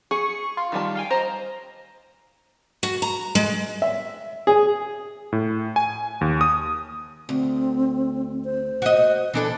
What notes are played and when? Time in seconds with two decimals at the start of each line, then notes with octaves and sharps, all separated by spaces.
0.11 G#4 C#6
0.57 F4
0.72 D#3 G3 A5
0.95 F5 G5 G#5
1.11 C5 D#5 A#5
2.83 F#4
3.02 A#5
3.35 G#3
3.82 E5
4.47 G#4
5.32 A2
5.76 G#5
6.21 D#2
6.41 D#6
7.29 D2 C4
8.45 C5
8.82 F#4 D#5
9.34 E3 D4 A4